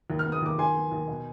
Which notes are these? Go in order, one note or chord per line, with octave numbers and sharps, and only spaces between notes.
D#2
F6
B3
D#6
D#2 D6
D#2 G#5 C6
B3
D#2
B2